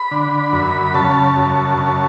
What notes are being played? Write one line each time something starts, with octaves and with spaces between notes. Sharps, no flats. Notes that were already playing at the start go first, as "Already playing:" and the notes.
Already playing: B5
D3
F#2
C#3 A5
F#2
C#3